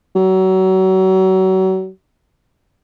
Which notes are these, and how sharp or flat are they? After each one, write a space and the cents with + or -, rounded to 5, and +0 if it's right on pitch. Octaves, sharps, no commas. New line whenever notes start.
F#3 +30